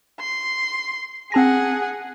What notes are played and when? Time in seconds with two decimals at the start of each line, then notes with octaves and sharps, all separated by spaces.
0.20 C6
1.32 C4 G#4 F#5 A5 A#6